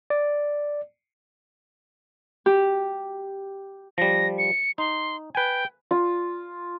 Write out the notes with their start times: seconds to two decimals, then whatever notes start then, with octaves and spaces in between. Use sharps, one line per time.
0.10 D5
2.46 G4
3.98 F3 G3 A#6
4.38 C#7
4.78 D#4 C6
5.35 B4 G5 G#5
5.91 F4